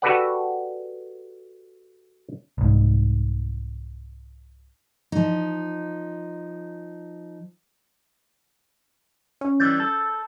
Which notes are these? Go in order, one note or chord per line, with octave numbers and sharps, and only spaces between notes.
F#4 G4 A4 B4 D5 F#5
C2 G#2
F3 D#4
C#4
E3 G3 G6 A6
A4